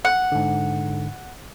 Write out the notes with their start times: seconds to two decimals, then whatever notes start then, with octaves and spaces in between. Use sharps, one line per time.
0.05 F#5
0.32 G#2 D3